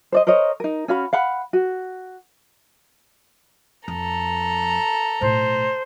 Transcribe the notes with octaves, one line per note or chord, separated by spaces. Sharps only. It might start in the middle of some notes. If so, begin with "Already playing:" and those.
C5 D5 D#5
A#4 C5 C#5 D#5
D#4 A#4
C#4 F#4 F5 B5
F5 F#5 B5
F#4
F2 A4 A#5
B1 A2 C5